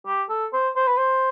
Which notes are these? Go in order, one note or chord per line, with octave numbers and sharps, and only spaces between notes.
G4
A4
C5
C5
B4
C5